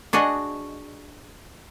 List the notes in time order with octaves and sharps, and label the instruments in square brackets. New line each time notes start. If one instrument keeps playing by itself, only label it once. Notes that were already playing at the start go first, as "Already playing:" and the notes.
[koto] D4 F#4 G#4 D#5